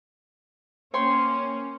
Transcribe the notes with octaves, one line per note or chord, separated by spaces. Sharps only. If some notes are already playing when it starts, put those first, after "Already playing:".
A#3 C#4 C#5 G5 C6